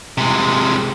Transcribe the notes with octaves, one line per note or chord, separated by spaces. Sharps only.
C3 G#3